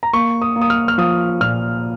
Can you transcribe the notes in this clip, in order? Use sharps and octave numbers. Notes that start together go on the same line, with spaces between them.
A#5
A#3 C#6
D#6
A#3
D#6
F6
F6
F3 D#6
A#2 F6